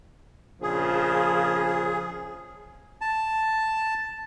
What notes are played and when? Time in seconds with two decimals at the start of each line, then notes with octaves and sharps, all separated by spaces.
0.62 A#1 C#3 F3 G#4
3.01 A5